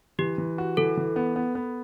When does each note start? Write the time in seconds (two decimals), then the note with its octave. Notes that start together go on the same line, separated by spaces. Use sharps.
0.19 E3 G4
0.38 E3
0.58 F#4
0.77 E3 A4
0.97 E3
1.16 B3
1.36 B3
1.55 B3